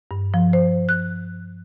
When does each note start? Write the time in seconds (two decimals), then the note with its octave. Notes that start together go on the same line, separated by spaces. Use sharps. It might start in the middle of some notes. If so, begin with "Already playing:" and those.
0.11 G2
0.34 F3
0.53 C5
0.89 F#6